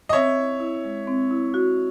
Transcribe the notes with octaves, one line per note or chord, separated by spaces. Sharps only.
D#5
C4 C#5 E5
E4
E4
G#3
C4
E4
F#4